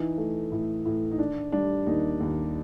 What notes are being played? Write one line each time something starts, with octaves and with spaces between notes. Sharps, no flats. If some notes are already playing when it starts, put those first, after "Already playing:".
Already playing: E3 D#4
A3
A2
A2
D#4
D#3 D4
G3 D4
D#2 D#4
D#2